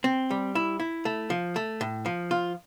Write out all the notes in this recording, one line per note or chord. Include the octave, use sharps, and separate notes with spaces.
C4
G3
E4
E4
A3
F3
A3
A2
F3
F4